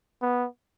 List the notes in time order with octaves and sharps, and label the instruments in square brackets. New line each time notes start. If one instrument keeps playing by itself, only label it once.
[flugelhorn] B3